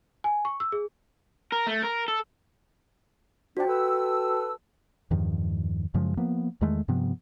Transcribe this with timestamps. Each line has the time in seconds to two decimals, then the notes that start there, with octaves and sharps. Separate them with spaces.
0.24 G#5
0.45 C#6
0.60 E6
0.72 G#4
1.52 A#4
1.67 A3
1.83 A#4
2.08 A4
3.57 F2 D4 F#4 G5
3.68 A4 B4 E6
5.11 E2 G2 D#3 F3
5.94 F#2 C#3 F3 G#3
6.17 F3 A#3 B3
6.61 E2 D#3 G#3 A3
6.88 G2 C3 F3 B3